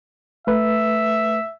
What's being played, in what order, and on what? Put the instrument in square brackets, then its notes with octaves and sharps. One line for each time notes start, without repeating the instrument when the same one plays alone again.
[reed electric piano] A3 B4 [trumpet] E5